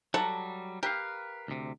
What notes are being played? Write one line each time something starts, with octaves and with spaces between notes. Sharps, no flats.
F#3 G3 A4 F#5 A#5
G4 A#4 B4 F5
D2 C3